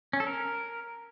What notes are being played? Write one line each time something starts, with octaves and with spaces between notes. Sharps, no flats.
C#4
A4
A#4